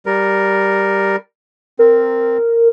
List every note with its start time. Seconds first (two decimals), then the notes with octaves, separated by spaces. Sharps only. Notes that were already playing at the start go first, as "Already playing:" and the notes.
0.06 G3 A#4
1.79 C4 A#4